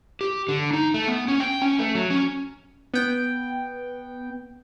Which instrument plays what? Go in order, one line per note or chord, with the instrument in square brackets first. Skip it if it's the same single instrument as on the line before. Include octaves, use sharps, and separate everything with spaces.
[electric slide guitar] G4
D3
D#4
A3
B3
C#4
G5
C#4
A3
F#3
C#4
[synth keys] B3 G5